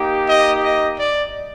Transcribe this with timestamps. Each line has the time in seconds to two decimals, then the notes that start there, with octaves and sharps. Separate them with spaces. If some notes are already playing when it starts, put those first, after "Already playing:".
Already playing: A#3 D#4 G4
0.28 D#5
0.64 D#5
0.99 D5